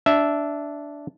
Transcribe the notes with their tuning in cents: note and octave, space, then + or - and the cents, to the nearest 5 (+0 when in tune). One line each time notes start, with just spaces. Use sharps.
D4 -10 E5 +0